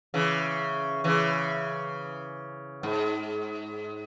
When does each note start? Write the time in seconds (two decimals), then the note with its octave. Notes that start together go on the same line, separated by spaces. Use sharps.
0.14 C#3 E3
1.04 C#3 E3
2.83 G#2